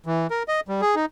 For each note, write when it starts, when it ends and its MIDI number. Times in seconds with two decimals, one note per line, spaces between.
0.06 0.27 52
0.30 0.43 70
0.48 0.60 75
0.68 0.81 55
0.81 0.95 68
0.95 1.05 63